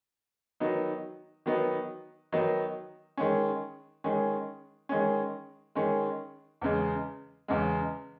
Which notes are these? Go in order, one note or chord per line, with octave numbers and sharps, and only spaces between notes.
D#3 F#3 B3 D#4
D#3 F#3 B3 D#4
D#3 F#3 B3 D#4
D#3 G#3 C#4
D#3 G#3 C#4
D#3 G#3 C#4
D#3 G#3 C#4
E2 C#3 G#3
E2 C#3 G#3